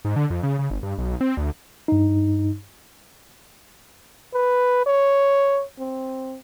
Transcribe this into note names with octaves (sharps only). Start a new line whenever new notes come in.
G#2
D3
F2
C#3
C#3
G1
G2
B1
C4
D2
G2 D#4
B4
C#5
C4